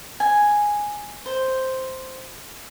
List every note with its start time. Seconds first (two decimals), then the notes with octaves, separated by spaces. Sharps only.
0.20 G#5
1.26 C5